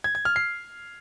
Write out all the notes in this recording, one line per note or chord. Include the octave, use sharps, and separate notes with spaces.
G#6
G#6
F6
C7